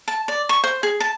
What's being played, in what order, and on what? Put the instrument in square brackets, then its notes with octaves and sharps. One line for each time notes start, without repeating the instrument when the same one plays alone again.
[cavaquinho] A5
D5
C#6
C5
G#4
A5